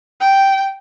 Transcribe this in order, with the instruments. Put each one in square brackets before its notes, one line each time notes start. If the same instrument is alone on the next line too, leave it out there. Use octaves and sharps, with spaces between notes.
[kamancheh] G5